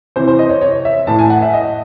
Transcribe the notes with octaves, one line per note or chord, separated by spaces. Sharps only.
C3 E3 C5
C5
D#5
C#5
C#5
E5
A2 E3 A5
G#5
F#5
E5
D#5